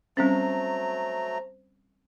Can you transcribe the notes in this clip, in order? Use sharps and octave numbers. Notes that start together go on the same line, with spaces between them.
F#3 G3 A3 C4 C#4 C5 A#5